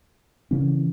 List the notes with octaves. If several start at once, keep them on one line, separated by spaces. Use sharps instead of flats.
C#3 E3 C#4